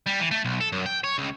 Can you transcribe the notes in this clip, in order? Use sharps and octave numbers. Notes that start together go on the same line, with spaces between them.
G3
E3
A3
B1
A4
F#2
G5
C#5
C#2